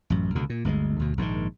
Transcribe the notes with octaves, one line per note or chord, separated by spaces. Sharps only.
A1 F#2
C#2 B2 D3
A#2
G1 D2 D3 G#3
D2 B2
A#1 G#2 C3 D#3